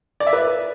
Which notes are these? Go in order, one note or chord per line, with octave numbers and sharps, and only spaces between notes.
D5
E5
B4